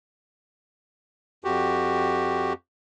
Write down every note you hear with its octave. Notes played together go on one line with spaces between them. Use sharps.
F2 F#4 G4